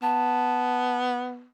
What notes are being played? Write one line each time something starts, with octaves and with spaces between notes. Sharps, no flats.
B3 A5